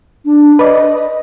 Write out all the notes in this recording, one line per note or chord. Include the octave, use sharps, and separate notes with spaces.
D4
B4 D5 D#5